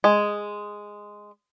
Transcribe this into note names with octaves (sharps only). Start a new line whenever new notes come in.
G#3